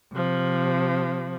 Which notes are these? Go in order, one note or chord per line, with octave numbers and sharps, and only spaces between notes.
C3 F3